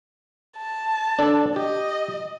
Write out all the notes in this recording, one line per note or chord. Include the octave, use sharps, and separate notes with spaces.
A5
D4 A4
G4 D#5